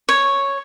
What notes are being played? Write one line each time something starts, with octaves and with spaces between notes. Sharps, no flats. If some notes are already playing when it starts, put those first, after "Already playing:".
C#5